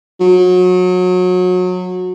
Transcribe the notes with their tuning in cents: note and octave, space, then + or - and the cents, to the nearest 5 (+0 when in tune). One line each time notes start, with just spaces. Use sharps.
F#3 -25